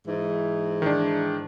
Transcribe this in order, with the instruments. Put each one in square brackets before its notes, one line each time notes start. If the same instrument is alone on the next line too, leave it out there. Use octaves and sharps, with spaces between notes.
[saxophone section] G#2 E3 D#4
[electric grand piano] D#3 D4